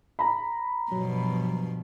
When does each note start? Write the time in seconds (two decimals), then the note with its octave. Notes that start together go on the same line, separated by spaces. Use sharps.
0.19 A#5 B5
0.92 G2 B2 F3 F#3